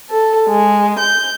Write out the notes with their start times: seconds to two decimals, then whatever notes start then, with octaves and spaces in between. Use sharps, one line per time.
0.10 A4
0.49 G#3
0.99 G6